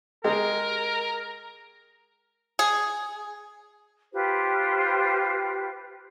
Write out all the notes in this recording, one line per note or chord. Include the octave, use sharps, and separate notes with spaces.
G#3 G4 G#4 A#4
G#4
F4 G4 B4 C5